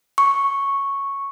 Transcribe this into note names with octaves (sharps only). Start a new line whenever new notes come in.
C#6